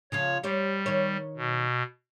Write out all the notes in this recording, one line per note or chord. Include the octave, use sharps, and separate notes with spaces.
C#3 F3 F4 C#5
G3 G4 C5 C#5
D#3 C#5
B2